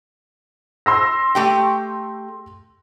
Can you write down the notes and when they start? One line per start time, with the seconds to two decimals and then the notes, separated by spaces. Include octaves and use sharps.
0.86 C6 E6 A#6
1.35 A3 G4 G5